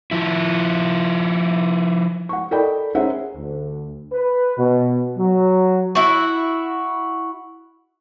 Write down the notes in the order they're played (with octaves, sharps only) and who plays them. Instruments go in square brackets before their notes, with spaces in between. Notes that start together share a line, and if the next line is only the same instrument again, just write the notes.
[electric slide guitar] F3 E4
[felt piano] F#5 C#6
A4 A#4 D5 D#5 G5 B5
C#4 D#4 G#4 C5 E5 F#5
[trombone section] D2
B4
B2
F#3
[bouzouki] E4 F#4